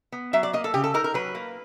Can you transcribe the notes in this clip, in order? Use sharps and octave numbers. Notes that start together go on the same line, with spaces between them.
B3
F#3 E5
D5
A#3 D#5
A4
C#3 G4
A4
D#4 A#4
A#4
F#3 B4
A#3